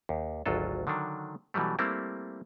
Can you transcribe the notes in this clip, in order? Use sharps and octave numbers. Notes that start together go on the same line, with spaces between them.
D#2
G#1 D2 F#3 F4 A4
D3 D#3 F#3 D4
B2 E3 F#3 G3 A3
G3 A3 A#3 C4 E4